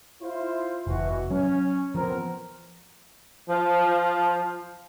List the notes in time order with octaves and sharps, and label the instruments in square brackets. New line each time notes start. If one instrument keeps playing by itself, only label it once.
[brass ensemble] E4 F4 C5
[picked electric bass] F1 [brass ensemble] B2 E3 F#4
[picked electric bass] F#3 [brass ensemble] C#4
[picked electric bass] F3 [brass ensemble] B3 C4 A#4
[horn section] F3